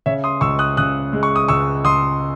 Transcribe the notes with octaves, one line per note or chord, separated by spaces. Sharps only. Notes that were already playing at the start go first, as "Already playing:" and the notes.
C#3 C#5 E5
C6 D#6
C#2 C#6 E6
D#6 F#6
C#3 D#6 F#6
G#3
C#6
D#6
C#2 C#6 E6
C#2 C6 D#6